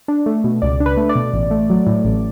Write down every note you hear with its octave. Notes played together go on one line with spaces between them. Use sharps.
D4
A3
B2
C#2 D5
D4
B4
A3
D5
B2
A1
A3
F#3
A2
A1